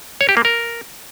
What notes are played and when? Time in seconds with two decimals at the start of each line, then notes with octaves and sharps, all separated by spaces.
0.21 C#5
0.29 G4
0.37 A#3
0.45 A#4